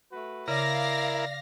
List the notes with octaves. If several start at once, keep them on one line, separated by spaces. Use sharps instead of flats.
A3 F#4 B4
C#3 E4 A#4 D5 F5 A#6